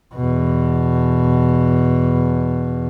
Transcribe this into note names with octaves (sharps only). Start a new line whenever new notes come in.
E2 B2